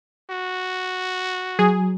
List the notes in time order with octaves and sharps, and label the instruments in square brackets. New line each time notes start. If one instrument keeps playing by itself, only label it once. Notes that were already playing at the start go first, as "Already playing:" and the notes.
[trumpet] F#4
[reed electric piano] F#3 [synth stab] G#4